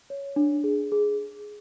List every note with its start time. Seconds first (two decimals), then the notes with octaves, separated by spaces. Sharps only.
0.10 C#5
0.36 D4
0.64 G#4
0.92 G#4